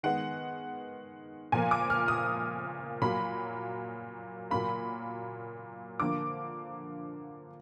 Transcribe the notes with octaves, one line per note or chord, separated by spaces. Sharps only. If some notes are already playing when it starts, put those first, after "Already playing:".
D#3 G#3 B3 F#5
A#2 F3 A#3 G#5
D6
F6
D#6
A#2 F#3 A#3 B5
A#2 F#3 A#3 B5
D3 F3 A#3 D6